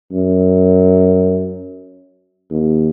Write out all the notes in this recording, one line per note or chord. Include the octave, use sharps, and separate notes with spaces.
F#2
D#2